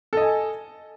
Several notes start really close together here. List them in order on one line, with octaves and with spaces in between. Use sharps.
A4 D#5 G#5